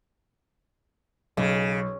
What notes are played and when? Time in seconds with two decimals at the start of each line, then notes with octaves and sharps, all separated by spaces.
1.37 B1 C#3